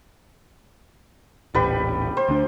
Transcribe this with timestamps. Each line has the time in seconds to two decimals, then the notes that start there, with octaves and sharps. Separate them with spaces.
1.55 D#1 A1 G3 B4 G5
2.17 C5
2.29 D2 D4